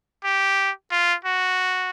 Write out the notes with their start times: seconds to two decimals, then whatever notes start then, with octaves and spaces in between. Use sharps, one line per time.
0.24 G4
0.91 F4
1.25 F#4